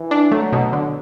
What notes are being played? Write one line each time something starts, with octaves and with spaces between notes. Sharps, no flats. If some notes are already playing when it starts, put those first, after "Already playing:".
Already playing: E3
D4
F#3 A3
B2
D3